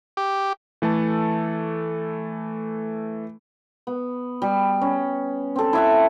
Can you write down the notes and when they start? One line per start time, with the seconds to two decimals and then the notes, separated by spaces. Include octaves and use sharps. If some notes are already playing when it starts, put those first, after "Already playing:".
0.17 G4
0.82 E3 A3 A4 A5
3.87 B3
4.42 G3
4.81 C#4
5.56 C4 A4
5.73 E4 E5 F#5